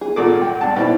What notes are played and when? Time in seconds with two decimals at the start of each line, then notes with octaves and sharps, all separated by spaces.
0.01 B3 G#4
0.16 G#1 A#2 A4 F#5 D6
0.42 G#3 G5
0.61 C2 D4 A5
0.76 B2 D#4 E4 C5 D5